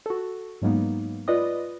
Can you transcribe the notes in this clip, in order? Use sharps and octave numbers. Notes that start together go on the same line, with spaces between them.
F#4 A4
G#2 F#3 G#3 A#3 B3 D#4
F4 B4 D5 D#5 D#6